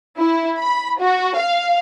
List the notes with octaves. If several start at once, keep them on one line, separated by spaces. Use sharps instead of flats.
E4
B5
F#4
F5